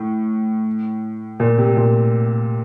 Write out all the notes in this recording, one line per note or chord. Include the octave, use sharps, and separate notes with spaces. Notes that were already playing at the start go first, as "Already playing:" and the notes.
Already playing: A2
A#2
C3
A#2